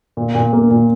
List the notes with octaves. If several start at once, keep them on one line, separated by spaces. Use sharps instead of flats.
A#2
A#2
A#3
A#2